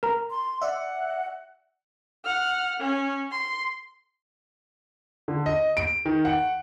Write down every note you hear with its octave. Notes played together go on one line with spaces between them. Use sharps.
A#4 A#5
C6
D5 E5 F#5
F#5 F6
C#4
C6
D3
D#5
D7
D#3
F#5